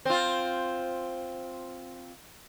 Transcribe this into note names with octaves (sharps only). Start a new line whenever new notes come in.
C4 F4